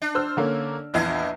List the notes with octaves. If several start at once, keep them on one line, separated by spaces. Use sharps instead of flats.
D4
C5 E6 F6
D3 A#3 C#4
A#1 E2 D4 E4 D#5 C7